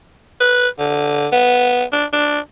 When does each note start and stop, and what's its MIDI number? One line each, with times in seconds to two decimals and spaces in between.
0.40 0.68 71
0.79 1.27 50
1.32 1.84 59
1.92 2.05 62
2.13 2.39 62